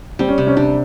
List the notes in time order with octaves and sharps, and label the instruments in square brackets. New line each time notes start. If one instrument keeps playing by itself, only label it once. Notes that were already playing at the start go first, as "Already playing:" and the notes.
[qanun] G3 [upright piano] C4
[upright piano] C#4
[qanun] C3
[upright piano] C#4
[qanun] G3 [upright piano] D4